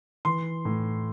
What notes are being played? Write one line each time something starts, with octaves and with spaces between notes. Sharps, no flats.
E3 C6
A2